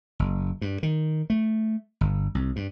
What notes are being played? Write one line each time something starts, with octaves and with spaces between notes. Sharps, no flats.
F#1
G2
D#3
A3
G1
C2
G2